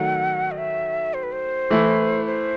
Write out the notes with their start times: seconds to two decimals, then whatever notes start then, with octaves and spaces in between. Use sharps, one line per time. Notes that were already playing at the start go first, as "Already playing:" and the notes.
Already playing: D#3 F#3 A3 F#5
0.51 D#5
0.58 E5
1.14 C5
1.23 B4
1.32 C5
1.71 E3 A3 E4
2.26 C5